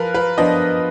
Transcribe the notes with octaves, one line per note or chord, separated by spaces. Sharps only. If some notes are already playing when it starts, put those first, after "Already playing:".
Already playing: F3 A#4 B4
B4
F3 B3 D4 D#5